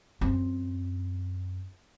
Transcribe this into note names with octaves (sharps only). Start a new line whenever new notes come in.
F#2 C4